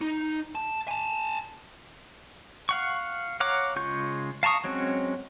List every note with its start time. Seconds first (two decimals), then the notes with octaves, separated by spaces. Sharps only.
0.01 D#4
0.55 A5
0.88 G#5 A5
2.69 F5 F#5 C#6
3.40 C#5 F5 F#5 A#5 D6
3.76 C#3 G#3 F4 C#6 G6
4.43 F5 A5 A#5 C#6 D#6
4.64 F#3 G#3 C4 C#4 F#4